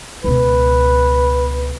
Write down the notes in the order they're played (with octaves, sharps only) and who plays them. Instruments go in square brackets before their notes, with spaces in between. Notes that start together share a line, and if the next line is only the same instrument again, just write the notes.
[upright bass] C#2 B2 [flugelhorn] B4